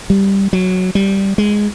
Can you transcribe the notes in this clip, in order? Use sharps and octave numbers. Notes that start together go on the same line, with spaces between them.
G3
F#3
G3
G#3